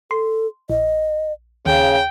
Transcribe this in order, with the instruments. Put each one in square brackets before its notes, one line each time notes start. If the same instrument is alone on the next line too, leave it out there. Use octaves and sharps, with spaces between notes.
[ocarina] A4 [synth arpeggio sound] C6
[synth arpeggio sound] A#1 [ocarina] D#5
[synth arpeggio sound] D#2 [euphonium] C#3 [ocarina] F5 [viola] G5